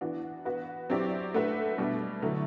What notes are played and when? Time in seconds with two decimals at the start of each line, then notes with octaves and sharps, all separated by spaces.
0.01 E3 B3 D4 F#4
0.45 B3 F#4 B4
0.90 F#3 C4 E4 G4 D5
1.34 A3 D4 F#4 B4 E5
1.78 B2 G3 D4
2.22 D3 F#3 A3 E4